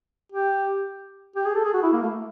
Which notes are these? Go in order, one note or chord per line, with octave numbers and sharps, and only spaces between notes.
G4
G4
G#4
A4
G#4
F#4
E4
A#3
A3